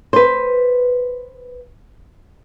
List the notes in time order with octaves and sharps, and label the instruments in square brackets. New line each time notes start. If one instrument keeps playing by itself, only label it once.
[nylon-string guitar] B4 C5